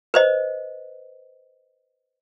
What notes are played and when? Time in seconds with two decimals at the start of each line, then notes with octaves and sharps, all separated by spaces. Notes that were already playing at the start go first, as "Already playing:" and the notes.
0.14 B4 C5 D#5